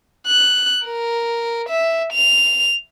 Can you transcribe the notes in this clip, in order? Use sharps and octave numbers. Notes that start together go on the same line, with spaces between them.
F#6
A#4
E5
F7